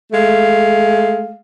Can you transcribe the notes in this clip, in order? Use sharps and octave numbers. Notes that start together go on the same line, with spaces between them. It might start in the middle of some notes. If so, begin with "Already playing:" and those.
G#3 A3 F5